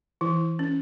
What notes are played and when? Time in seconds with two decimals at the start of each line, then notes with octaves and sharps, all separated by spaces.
0.21 E3 E4
0.59 C#4